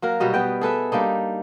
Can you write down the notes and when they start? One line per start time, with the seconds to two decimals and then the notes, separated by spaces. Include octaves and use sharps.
0.02 F#3 A#3 A#4
0.20 B2 F#3 G3 D#5
0.34 B3 B4 G5
0.61 G#4 A4 B4 E5
0.92 G3 A#3 D4 D#4